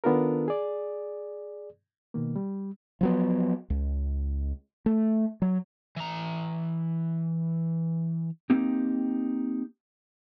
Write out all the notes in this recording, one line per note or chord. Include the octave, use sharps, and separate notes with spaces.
D#3 B3 D4 F4 A4 A#4
G#4 D5
B2 D#3 A#3
G3
F3 F#3 B3
C#2
A3
F#3
E3 A#5
A#3 C4 D#4 G4